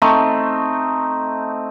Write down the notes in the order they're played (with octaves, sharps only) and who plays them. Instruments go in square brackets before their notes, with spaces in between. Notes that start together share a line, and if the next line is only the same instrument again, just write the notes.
[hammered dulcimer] A3 C4 D#4